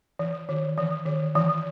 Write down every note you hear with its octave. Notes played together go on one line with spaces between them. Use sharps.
E3
D#3
E3
D#3
E3